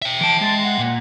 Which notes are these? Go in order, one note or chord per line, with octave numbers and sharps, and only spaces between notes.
E5 G5
E3 A5 D7
G#3 A5
F#5
A#2